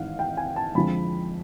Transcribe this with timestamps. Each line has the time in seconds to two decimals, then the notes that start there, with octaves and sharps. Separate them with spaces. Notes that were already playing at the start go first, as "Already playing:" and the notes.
Already playing: G#1 G#2 E3 F5 F#5
0.19 G5
0.37 G#5
0.56 A5
0.75 F2 D3 F3 G#3 B5